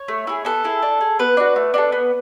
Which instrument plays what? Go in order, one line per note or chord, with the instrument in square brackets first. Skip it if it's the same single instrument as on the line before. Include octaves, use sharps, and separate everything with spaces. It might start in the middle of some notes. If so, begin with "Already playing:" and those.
Already playing: [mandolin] C#5
A3
E4 G#4
B3 A4
E4 G#4
D4
G#4
B3 B4
D4 F#4
A3
D4 F#4
A4
B3